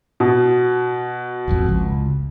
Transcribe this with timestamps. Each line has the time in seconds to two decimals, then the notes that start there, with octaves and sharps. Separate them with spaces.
0.20 B2
1.48 D#1 G#1 F2
1.68 C#2